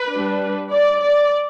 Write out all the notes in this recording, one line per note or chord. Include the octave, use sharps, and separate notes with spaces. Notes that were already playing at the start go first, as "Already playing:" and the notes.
Already playing: B4
G3 D4
D5
D5